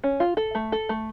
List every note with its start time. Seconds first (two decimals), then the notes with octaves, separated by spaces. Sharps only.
0.04 C#4
0.20 F4
0.37 A4
0.55 A3
0.72 A4
0.89 A3